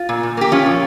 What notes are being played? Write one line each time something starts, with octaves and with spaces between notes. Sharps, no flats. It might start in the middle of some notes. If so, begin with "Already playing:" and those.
Already playing: F4
A#2
A#2
A#3 G4
F3 C#4 F4
A#2